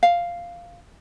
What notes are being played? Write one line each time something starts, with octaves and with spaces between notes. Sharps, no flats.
F5